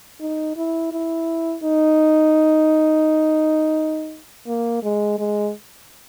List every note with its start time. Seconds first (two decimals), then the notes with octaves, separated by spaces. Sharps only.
0.21 D#4
0.57 E4
0.92 E4
1.63 D#4
4.47 A#3
4.83 G#3
5.19 G#3